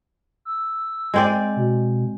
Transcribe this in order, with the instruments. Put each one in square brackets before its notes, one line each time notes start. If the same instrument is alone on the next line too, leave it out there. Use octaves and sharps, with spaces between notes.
[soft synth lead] E6
[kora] G#3 C4 D5
[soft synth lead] B2